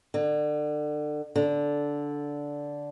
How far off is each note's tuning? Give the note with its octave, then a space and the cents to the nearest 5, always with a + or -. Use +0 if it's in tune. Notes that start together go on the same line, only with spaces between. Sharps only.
D3 +30
D3 -10